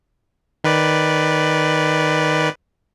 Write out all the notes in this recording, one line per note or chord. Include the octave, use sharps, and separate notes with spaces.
D#3 B4 D5